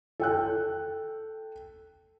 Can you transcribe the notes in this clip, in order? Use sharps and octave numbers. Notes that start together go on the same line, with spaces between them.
A4 G5 F#6